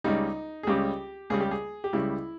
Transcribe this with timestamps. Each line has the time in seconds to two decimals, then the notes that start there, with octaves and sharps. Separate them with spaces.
0.04 C#2 C#3 G3 D#4
0.63 G#4
0.67 C#2 C#3 G3 G4
1.30 C#2 C#3 G3 G#4
1.41 G4
1.51 G#4
1.84 G4
1.93 C#2 C#3 G3 E4